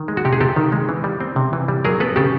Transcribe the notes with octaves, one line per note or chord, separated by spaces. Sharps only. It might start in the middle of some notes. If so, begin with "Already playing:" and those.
Already playing: D#3
G#3
F#4
C3 G4
G#4
C3 G4 A4
D#3
G#3
E3
G3
C4
C3
E3
G3
F#3 G#4 A#4
B3 A4 B4
C#3 G4 A4